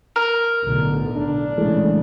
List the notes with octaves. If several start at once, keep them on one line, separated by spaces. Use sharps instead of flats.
A#4
B1 A2 D3
D4
A#1 C#3 E3 G#3 A3